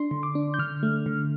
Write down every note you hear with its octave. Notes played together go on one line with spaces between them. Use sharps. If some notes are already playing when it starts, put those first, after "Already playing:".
Already playing: D4 C6
D3
D6
D4
G6
D3 F6
A3
D3